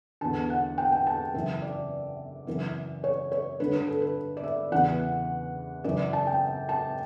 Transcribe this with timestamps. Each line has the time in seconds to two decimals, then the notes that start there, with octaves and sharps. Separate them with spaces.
0.21 E2 D3 A5
0.50 F#5
0.78 G5
0.92 G5
1.07 A5
1.34 F#2 C#3 E3 E5
1.62 D5
2.47 F#2 C#3 E3
3.04 C#5
3.32 C#5
3.60 G2 D3 B4
3.74 B4
3.88 A4
4.02 B4
4.37 D5
4.44 E5
4.72 E2 C#3 E3 F#5
5.84 F#2 C#3 E3 D5
6.13 A5
6.27 G5
6.69 A5